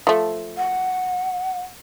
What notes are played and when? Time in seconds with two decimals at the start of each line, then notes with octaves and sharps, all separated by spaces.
0.07 F3 A3
0.57 F#5